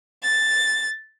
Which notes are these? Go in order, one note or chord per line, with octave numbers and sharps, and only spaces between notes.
A6